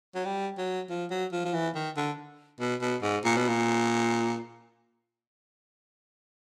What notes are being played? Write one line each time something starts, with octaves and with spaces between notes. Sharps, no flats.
F#3
G3
F#3
F3
F#3
F3
F3
E3
D#3
D3
B2
B2
G#2
A#2
B2
A#2